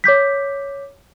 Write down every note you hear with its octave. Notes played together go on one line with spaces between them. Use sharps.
C#5 D6 G6 B6